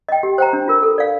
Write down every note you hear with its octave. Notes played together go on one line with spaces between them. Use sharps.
D#5 G5
G4
C5 G5 A#5
D4
F4 A#4
A4
D5 F5